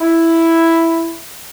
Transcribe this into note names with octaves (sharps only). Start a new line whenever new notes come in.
E4